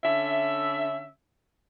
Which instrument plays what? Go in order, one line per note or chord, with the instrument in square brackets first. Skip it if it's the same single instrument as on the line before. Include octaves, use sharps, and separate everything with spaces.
[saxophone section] D3 C#4 E5